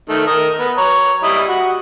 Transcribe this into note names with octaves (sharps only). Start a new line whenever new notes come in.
D#3 A3
A#4 D#5
B3
C#5 A#5
G3 E4 D#5
F#4